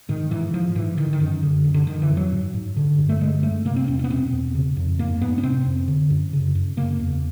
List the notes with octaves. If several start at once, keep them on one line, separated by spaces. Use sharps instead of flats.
G#2 D#3
G#2 E3
G#2 F3
G#2 E3
D3 D#3
D#3
F#2
D3
F#2
D3
D3 D#3
E3
F2
F#3
G#2
G#2
D3
G2
A3
D3 G#3
G2 A3
C3 A#3
C4
E2 C#4
C#4
B3
B2 C4
E2
C#3
F2
G#2 A#3
G#2 B3
C#4
C3 C4
F2
D3
F#2
C#3
F#2
C#3 A#3
E2